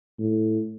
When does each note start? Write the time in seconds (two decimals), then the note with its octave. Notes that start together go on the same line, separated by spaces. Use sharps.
0.19 A2